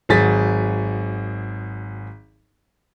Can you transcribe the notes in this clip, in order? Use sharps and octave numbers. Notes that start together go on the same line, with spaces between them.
G#1 F#3 G#4 A6 B6